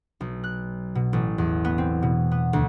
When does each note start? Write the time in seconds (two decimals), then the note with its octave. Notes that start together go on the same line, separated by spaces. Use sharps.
0.21 B1
0.44 F#6
0.95 B2
1.13 A1
1.38 E2
1.64 B3
1.78 C4
2.02 B2
2.32 B3
2.53 D2